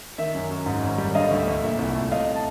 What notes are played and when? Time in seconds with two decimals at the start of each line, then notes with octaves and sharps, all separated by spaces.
0.18 D#3 E5
0.34 F#2
0.51 F#2
0.66 G#2
0.83 G#1
0.98 G3
1.15 D3 D#5 F5
1.31 D2
1.39 E5
1.48 D2
1.63 A#2 E5
1.79 C2
1.95 A3
2.12 C3 D#5 F5
2.35 A5